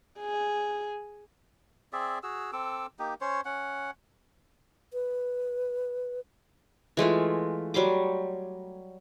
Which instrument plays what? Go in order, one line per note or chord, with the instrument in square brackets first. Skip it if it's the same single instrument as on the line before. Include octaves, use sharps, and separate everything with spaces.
[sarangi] G#4
[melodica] C4 G#4 D5 E5
F#4 G#4 E6
C4 A4 D6 E6
A#3 D#4 G4
C#4 C5 C#5
C#4 F#5
[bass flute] B4
[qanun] E3 G#3 A3 F4
F#3 G3 C6 D6